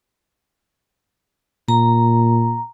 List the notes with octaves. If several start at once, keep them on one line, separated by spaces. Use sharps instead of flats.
A#2 A#5